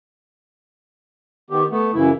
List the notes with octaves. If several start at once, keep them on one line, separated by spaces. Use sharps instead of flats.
D#3 B3 G4
A3 B3
F#2 C#3 E3 E4